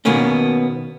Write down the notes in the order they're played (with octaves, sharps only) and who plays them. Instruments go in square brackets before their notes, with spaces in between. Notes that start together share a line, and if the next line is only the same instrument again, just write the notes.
[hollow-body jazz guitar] B2 D#3 A#3 B3 C#4